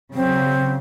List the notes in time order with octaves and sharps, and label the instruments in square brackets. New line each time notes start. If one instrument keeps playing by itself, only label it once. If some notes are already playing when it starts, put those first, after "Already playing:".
[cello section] C#3 F#3 [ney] C4